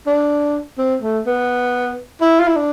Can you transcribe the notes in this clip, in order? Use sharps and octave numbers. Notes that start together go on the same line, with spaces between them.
D4
C4
A3
B3
E4
F4
E4
D4